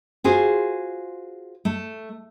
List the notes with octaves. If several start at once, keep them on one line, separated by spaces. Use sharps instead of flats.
F4 F#4 G#4 C5
A3